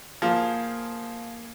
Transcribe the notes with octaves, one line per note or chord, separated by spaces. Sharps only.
F3 A#3 G#4